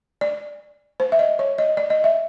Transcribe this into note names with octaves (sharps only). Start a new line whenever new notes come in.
D5
C5
E5
D#5
C#5
D#5
D5
D#5
E5